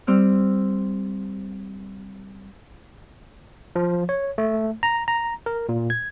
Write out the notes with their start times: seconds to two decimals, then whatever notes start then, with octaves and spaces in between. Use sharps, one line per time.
0.07 G3 C4 E6 F6
3.76 F3
4.09 C#5
4.38 A3
4.83 A#5
5.08 A#5
5.46 A#4
5.69 A#2
5.90 G#6